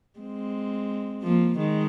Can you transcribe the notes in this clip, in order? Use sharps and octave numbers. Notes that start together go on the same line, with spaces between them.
G#3 C4
F3 A#3
D#3 G#3